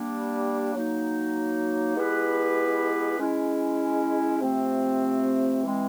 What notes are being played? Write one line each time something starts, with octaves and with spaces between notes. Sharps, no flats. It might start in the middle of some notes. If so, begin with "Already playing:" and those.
Already playing: G3 A#3 D4
F#3 A#3 D#4
G#3 B3 E4 G4 B4
G#3 C#4 E4
C3 F3 A3 C4
E3 G#3 C4